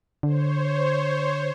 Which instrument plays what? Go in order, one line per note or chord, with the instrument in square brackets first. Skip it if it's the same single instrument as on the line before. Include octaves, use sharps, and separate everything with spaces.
[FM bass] D3 [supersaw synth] C5 C#5